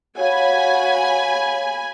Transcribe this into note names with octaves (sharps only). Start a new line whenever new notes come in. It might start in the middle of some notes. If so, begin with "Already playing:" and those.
F#4 C#5 F5 G#5 B5